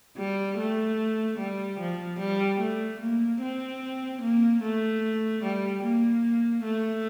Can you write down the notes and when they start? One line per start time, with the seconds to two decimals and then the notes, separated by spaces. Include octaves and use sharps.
0.17 G3
0.58 A3
1.39 G3
1.80 F3
2.19 G3
2.60 A3
3.00 A#3
3.41 C4
4.21 A#3
4.62 A3
5.43 G3
5.83 A#3
6.64 A3